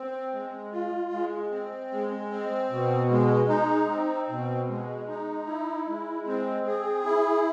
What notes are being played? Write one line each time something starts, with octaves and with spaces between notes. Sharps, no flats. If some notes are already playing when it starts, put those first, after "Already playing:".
Already playing: C4
G#3
F4
G#3
C4
G#3
C4
B2
G#3
D#4
C4
B2
G#3
D#4
E4
G#3
C4
G#4
E4